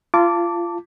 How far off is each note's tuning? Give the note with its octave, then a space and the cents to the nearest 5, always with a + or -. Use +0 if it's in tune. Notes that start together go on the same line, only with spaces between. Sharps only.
F4 -25 A5 +20 D6 -15